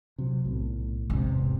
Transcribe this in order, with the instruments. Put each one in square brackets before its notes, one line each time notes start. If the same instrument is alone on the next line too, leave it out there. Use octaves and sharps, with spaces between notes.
[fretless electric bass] C3 F#3
B1 A2
[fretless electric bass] E1 C3 [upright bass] G#2